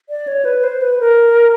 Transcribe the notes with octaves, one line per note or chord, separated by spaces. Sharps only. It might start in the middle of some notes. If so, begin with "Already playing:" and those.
D5
C#5
B4
C5
B4
A#4